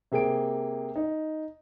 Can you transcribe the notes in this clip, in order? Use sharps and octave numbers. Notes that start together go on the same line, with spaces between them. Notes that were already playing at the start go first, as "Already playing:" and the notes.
C3 A#3 G#4 G5 D7
D#4